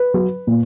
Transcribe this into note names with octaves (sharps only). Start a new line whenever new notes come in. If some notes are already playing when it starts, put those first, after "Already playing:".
Already playing: B4
F#3
A#2